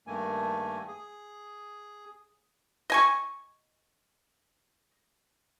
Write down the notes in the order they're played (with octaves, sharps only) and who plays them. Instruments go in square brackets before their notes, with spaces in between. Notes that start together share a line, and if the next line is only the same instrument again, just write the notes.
[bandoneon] G2 D#3 A3 A#3 G#5
G#4
[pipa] D#5 G#5 C#6